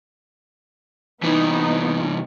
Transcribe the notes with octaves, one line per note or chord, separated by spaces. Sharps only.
C2 E3 B3 D#4